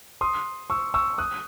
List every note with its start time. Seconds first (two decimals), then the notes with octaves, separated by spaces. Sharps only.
0.21 C6 D#6
0.70 C#6 E6
0.94 C#6 E6
1.18 D#6 F#6